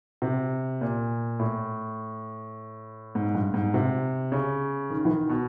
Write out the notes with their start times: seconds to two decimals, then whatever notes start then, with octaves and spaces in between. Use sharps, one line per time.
0.22 C3
0.81 A#2
1.40 A2
3.15 G#2
3.35 G2
3.54 G#2
3.74 C3
4.32 C#3
4.90 D#3
5.05 E3
5.10 D#3
5.29 B2